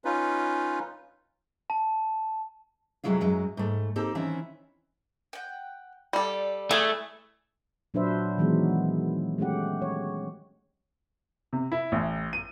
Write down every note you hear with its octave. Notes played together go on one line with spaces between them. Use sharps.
C#4 D#4 F4 B4
A5
F2 C3 F#3 G#3 E4 F4
F#2 F#3 G#3
G#2 A3
A#3 C4 D#4 G4 A4
D#3 E3 C4 C#4 E4
F#5 G5
G3 A4 D5
E3 A3 G#4
A#2 F#3 D4 B4 C5 E5
D#3 E3 F#3 G#3 B3
G#3 A3 C#4 G4 F#5
C#5
C3
E4
A1
D#7